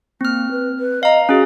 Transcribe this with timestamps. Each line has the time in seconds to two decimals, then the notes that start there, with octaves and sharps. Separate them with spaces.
0.21 A#3 C4 F6
0.51 B4
0.78 B4
1.03 D#5 F5 A#5
1.29 C#4 F#4 G#4